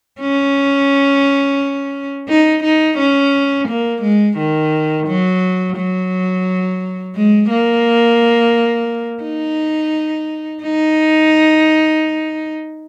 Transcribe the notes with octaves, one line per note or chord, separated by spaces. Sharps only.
C#4
D#4
D#4
C#4
A#3
G#3
D#3
F#3
F#3
G#3
A#3
D#4
D#4